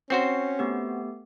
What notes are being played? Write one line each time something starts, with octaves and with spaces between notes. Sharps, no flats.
C4 C#4 F#4 C5 C7
A3 B3 G4